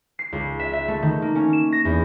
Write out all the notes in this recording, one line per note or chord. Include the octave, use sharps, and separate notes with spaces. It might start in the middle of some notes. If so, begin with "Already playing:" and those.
C7
C#2
E5
E5
A3
D#3
A#3
C#4
E7
A#6
E2